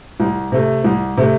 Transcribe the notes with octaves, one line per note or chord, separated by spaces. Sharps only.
C2
C3 A3
C2
C3 A3